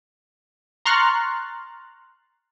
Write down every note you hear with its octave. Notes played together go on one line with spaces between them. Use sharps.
A#5 C6 C#6 F6 F#6 A6